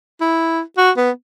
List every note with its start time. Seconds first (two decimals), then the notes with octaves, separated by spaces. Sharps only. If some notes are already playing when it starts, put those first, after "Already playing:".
0.21 E4
0.77 F#4
0.97 B3